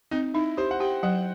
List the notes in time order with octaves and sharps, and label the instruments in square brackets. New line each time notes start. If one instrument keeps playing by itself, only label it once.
[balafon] C4 [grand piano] D#4
[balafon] D#4 [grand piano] E4
[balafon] G4 [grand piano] C5
[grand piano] F#5
[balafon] G4 [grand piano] G5
[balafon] F#3 [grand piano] F#5